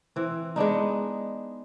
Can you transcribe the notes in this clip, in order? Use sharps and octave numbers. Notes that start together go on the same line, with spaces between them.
E3 C4
G#3 B3 D4 D#4